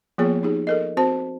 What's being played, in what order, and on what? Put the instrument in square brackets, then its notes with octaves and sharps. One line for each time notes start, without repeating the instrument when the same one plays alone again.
[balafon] F3 A#3 B3 F4 G#4 C#5
D#4 G4 G#4
A4 A#4 D#5
C4 F#4 C5 A5